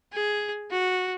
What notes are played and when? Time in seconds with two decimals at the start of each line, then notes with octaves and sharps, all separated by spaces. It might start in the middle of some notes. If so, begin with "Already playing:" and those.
0.13 G#4
0.71 F#4